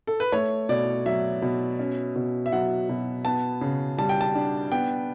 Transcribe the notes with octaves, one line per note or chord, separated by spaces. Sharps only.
A4
B4
A3 C#5
B2 D5
F#3 E5
B2
C#4
B2
E5
F#3 F#5
B2
B3 A5
C#3
G3 A5
G5
A5
D4
B3 G5